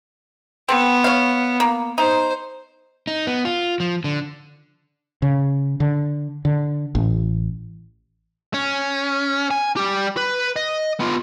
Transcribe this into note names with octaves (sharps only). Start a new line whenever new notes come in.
B3 C4
C#5 F5
A#3
D#4 C5
D#4
B3
F4
F3
D3
C#3
D3
D3
A1
C#4
G#5
G3 G4
B4
D#5
B3 F4